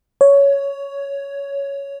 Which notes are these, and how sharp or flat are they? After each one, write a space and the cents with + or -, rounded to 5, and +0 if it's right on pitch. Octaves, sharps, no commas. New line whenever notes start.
C#5 +10